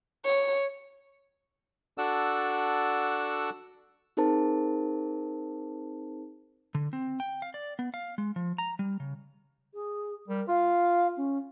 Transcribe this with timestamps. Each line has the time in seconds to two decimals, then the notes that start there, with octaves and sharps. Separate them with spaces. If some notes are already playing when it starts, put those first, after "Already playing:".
0.25 C#5
1.98 D4 F#4 A4 D5 F#5 E6
4.17 C4 D#4 G#4 A#4 C5 A5
6.75 D3
6.93 C4
7.20 G5
7.42 F5
7.54 D5
7.79 B3
7.94 F5
8.18 G#3
8.36 F3
8.58 A#5
8.79 G3
9.00 C#3
9.74 G#4
10.28 G3 A#4
10.48 F4 F5
11.17 C#4